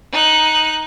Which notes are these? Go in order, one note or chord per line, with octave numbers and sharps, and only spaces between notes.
D#4 F#6